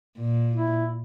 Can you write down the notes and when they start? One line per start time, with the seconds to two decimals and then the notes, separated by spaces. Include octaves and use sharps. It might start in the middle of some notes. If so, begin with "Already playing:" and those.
0.20 A#2
0.54 E4